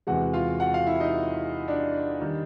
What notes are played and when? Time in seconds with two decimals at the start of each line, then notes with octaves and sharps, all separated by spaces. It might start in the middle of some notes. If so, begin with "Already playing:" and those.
0.07 E2 C3 E3 G#3 F#4 F#5
0.33 F4 F5
0.60 F#4 F#5
0.73 F4 F5
0.87 E4 E5
1.00 D#4 D#5
1.68 D4 D5
2.21 D#3 G3